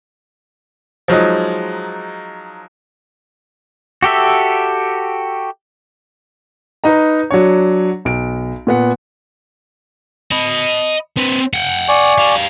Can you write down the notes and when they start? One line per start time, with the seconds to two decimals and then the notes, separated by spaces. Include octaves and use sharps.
1.08 F3 F#3 G#3 D#4
4.03 F#4 G4 A4 E5
6.84 D#4 B4 D#5 A#5
7.31 F#3 D4 C#5
8.05 B1 D7
8.67 A#2 B3 F#5
10.32 D#5 B5
11.17 C4 B4
11.54 F#5 G5
11.89 D5 G#5 C#6
12.18 G3 F5